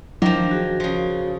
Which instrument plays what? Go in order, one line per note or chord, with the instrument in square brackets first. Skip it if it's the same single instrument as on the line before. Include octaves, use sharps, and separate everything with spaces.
[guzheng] D#3 F3 [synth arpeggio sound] F#3 E4 [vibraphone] D4
[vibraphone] F#4 G#4
[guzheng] C#3 F3